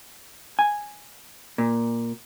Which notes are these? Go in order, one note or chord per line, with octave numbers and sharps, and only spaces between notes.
G#5
A#2